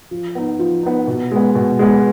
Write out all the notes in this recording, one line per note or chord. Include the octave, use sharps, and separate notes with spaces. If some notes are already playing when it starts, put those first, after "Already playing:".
F3
B3 D#4
F3
B3 D#4
B2
G#3 B3
B2
G#3 B3